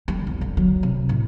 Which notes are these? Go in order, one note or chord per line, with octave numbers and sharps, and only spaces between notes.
G3
E2
D3
F#3
C3
A2